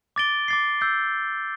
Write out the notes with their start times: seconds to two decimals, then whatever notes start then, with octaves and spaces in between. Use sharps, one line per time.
0.16 D6 A6 D7 G7
0.48 D6 A6 C7
0.81 E6 G6 C7